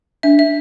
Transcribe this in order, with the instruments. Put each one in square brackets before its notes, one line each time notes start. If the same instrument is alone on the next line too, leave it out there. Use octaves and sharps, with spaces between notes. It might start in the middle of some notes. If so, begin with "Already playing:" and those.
[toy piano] D4 [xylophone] E5
[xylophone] E5